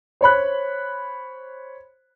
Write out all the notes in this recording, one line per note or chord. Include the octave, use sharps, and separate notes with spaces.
C5 C#5 B5 F#6